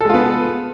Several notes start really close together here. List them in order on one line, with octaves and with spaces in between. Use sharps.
A4 G#3 F4 B3